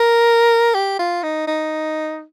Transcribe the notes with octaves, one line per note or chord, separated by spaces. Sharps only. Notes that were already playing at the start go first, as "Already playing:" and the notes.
Already playing: A#4
G4
F4
D#4
D#4